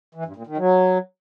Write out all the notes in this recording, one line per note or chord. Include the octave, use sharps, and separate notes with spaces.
E3
G2
A#2
D#3
F#3